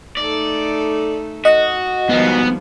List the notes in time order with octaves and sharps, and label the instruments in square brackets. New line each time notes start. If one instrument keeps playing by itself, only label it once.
[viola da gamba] A3 D#4 A4 [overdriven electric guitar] D5
[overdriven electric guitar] F#4 [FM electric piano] D#5
[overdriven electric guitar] G#2 B2 [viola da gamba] D#3 F3 G3 [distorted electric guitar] B3